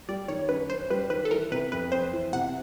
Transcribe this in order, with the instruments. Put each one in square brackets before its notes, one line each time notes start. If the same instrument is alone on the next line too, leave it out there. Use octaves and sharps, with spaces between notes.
[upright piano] G3 [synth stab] D5
[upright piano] D#3 [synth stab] C#5
[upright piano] F#2 [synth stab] B4
[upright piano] F#2 [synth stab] C5
[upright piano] G3 [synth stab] B4
[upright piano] D#3 [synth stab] B4
[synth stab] A4
[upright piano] E3 [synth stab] A#4
[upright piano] C3 [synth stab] B4
[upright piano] F2 [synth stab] B4
[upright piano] F2 [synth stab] C5
[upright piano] E3
[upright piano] C3 [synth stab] F#5